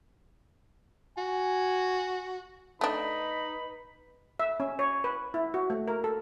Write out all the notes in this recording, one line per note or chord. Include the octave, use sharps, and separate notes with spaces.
F#4 G#5
A3 D4 D#4 B4 B5
E5
C#4
C#5
B4
E4
F#4
A3
A#4
A4